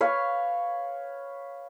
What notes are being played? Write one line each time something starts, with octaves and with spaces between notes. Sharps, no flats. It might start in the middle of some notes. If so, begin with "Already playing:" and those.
B4 C#5 F5